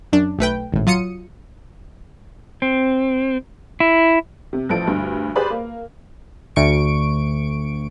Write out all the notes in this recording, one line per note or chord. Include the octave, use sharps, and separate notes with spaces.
F#2 D4
B1 A3 B4 G5
G#1 A2
F#3 F4 D#6 C#7 D#7
C4
E4
C3
A1 F3 A4 D7
D2 G2
G4 G#4 B4 C5 D5 B5
A#3
D2 C#6 D7